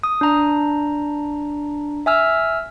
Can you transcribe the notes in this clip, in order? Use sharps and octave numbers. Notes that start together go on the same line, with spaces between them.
D#6
D4 A#5
E5 G#5 E6 F6